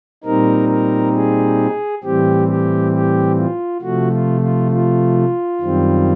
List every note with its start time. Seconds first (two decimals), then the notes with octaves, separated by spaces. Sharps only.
0.24 A#2 G3 C4 D#4 A#4
0.69 A#4
1.15 G#4
2.04 A2 E3 G3 C4 G4
2.48 G4
2.92 G4
3.37 F4
3.82 C3 F3 A3 F#4
4.12 F4
4.41 F4
4.71 F4
5.61 F#2 D#3 G3 C4